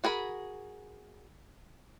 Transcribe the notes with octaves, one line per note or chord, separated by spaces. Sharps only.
F#4 G#4 A#4 B5